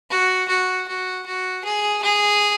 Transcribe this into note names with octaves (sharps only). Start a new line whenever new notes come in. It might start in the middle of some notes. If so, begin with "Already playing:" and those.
F#4
F#4
F#4
F#4
G#4
G#4